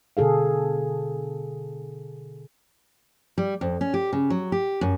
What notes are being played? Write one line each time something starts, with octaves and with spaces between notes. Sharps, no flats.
B2 D3 G#4 A4 F5
G3
F2
C#4
G4
C#3
F#3
G4
F#2